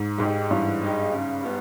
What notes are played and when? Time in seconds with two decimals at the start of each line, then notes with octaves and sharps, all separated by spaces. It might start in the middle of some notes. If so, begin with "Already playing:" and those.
Already playing: G#2
0.19 G#2 G#3 D#4 G4
0.50 G2 E3
0.82 G#3 D#4 G4
1.13 C#3
1.44 G3 B3